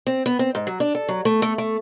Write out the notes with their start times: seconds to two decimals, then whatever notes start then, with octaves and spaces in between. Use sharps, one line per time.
0.07 C4
0.26 B3
0.39 C4
0.55 G#2
0.67 F#3
0.80 D4
0.95 A4
1.09 F#3
1.25 A3
1.42 A3
1.58 A3